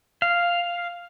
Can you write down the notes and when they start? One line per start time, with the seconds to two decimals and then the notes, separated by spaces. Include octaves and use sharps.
0.22 F5